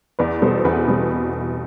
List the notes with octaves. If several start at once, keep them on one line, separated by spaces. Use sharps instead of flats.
E2 B4 D5
B2 G3 A4 C5
C5
E2 B4
B2 G3